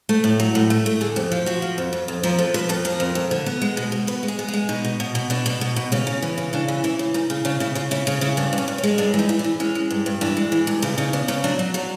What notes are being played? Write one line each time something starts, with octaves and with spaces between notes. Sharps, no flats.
A3
A2
F#3
A2
A3
A3
D3 G#4
F2 G4
F3 F4
F3 F#4
F3
F2
F2
F2
F3 A#4
F2 A4
F3 B4
F2 A4
F3 A#4
F2
F2
D3
B3
G#3
B2
B2
B3 B4
G#3
G#4
B3
G#4
G#3
B2 D#4
B2
B2
B2
B2 D4
B2
B2
B2
C#3 C#4
C#3
E3
C#3
C#3 D4
E3
E3 E4
C#3
C#3 D#4
C#3
C#3 D4
C#3 E4
C#3 F4
C#3 E4
C#3
C#3 E4
G2 D4
G2
C#4
G2
C#4
G#3
G2 D4
E3 D#4
E3
D4
E3
G#3 C#4
G#3
G2
G2
E3 D4
G#3
E3
G2
C#3 E4
C#3 D#4
B3 D4
C#3 C#4
F#3 D4
F#3
F#3 D4